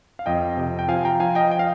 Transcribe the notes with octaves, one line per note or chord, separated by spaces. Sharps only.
F5
F2 D#5 G5
C3
G5
F3 F5 G#5
G5 A#5
F3 F5 G#5
D#5 G5
G5
F5